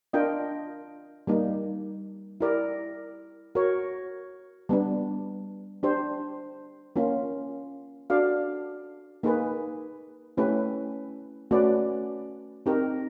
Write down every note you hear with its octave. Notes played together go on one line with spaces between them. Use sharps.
D4 F4 A#4 D#5 G5
G3 A#3 D#4
E4 G4 A#4 D5
F#4 A#4 C#5
G3 B3 D4
D4 G4 C5
A#3 C#4 F4
D4 F#4 A4 D5 F5
A#3 D#4 G#4 B4
A3 C#4 E4 G4 B4
A3 C#4 F#4 B4 D5
C4 D#4 G4 A#4